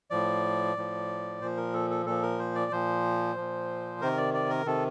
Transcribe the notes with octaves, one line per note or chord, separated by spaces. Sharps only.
A2 F3 D5
A2 F3
A#2 F3 C5
A#4
A4
A4
A#2 F3 A4
A#4
C5
D5
A#2 F3 C5
A#2 F3
C3 D#3 A#4
D5
D5
A#4
C3 D#3 A4